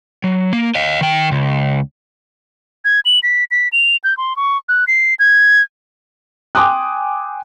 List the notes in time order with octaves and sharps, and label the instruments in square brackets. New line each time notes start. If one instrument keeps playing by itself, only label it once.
[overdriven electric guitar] F#3
A#3
D#5 F5
D#3 G5
C#2
[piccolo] G#6
F#7
B6
B6
F7
G6
C6
C#6
F#6
C7
G#6
[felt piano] G5 G#5 C6 D6 D#6 F#6